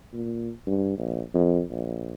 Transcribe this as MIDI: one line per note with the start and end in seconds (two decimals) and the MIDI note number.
0.14 0.51 46
0.67 0.97 43
0.98 1.21 34
1.34 1.61 41
1.70 2.13 34